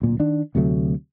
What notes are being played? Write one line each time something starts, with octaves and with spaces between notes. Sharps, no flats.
D1 A#2
D#3 D4
D2 C3 F#3 A3